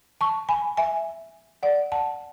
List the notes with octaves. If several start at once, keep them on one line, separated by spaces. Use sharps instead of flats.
A5 C#6
G#5 B5
E5 G#5
D5 F#5
F#5 A5